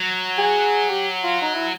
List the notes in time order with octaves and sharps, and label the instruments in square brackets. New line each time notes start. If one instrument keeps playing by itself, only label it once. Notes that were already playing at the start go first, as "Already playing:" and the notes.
Already playing: [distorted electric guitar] F#3
[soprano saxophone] G#4
G4
F4
D#4
E4